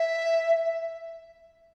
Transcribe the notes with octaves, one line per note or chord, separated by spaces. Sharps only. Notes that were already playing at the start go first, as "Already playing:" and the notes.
Already playing: E5